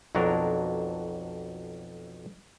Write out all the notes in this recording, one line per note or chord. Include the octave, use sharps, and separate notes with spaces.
B1 F2 F#3 D4 A#4